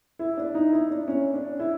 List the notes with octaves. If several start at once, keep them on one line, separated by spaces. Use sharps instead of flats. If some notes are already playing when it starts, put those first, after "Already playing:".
E4
D4
D#4
E4
D4
C#4
D4
E4